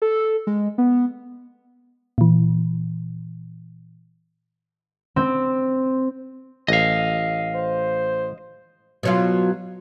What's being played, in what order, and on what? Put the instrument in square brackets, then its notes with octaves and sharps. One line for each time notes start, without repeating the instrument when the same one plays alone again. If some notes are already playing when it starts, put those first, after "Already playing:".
[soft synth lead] A4
G#3
B3
[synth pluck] A#2 E3
[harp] C4
[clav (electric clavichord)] A1 [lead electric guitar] D#5 F5
[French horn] C5
[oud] B2 F#3 F4